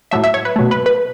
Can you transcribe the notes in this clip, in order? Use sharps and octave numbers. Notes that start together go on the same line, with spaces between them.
A2 F#3 A3 E5
E5
C#5
B4
B2 F#3 A3
B4
B4